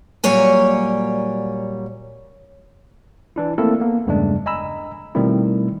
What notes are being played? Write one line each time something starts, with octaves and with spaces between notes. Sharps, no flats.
A#2 F#3 G3 A#3 C#5 G#5
E3 D4 E4
A3 A#3 C4 E4 A4 A#4
A#3 B3
E2 G2 C#3 G#3 A3 D4
D#5 G#5 A#5 B5 E6
B2 D#3 G3 A3 C4 E4